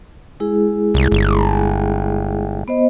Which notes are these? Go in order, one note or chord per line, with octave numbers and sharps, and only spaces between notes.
G#3 E4 G#4
C2
G1
B3 C5 D#5